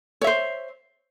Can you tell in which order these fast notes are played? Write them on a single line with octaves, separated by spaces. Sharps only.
C#5 E5 C5